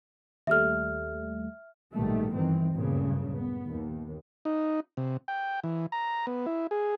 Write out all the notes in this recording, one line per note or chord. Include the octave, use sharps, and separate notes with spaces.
D#2 G3 A3 E5 F6
A#1 G#2 B2 D#3 G3 A3
G1 D#3 E3 C4
F#1 D2 G2 A#2 C#3
B3
D#2
D#4
C3
G5
E3
A#5
B3
E4
G#4